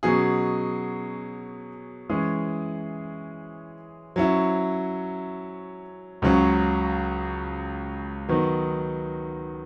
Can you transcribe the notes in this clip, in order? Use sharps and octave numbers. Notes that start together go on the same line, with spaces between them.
B2 F#3 C#4 G#4
E3 G#3 C#4 G#4
F#3 C#4 E4
C#2 C#3 F#3 C#4
D#3 F#3 B3 D#4